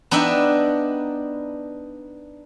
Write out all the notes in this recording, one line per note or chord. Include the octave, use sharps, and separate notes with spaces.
B3 D4 D#4 E5 G5